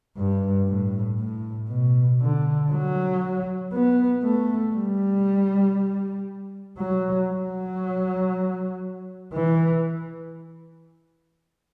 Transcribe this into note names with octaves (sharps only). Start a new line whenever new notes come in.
G2
A2
A2
B2
D3
F#3
B3
A3
G3
F#3
F#3
E3